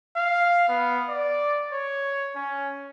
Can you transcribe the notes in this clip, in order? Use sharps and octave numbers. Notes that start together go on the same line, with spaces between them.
F5
B3
D5
C#5
C#4